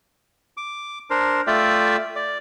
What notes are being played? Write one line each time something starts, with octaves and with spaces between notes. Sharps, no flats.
D6
D4 A#4 C5
A3 F4 D5 E5 G5
D5